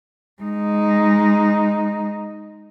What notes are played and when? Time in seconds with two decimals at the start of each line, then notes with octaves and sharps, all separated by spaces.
0.43 G#3 D#4